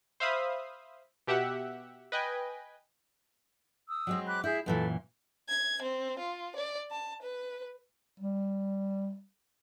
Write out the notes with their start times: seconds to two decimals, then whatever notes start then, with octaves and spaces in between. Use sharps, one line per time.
0.20 C5 E5 F5 B5 D#6
1.27 B2 G4 E5 F#5
2.12 B4 D#5 G5 G#5
3.88 D#6 E6
4.07 F#3 G#3 C4
4.26 B5 D6 F#6
4.44 E4 G#4 E5 G6
4.66 F#2 A#2 E3 A4 B4
5.49 G#6
5.82 C4
6.19 F4
6.56 D5
6.91 A5
7.22 B4
8.20 G3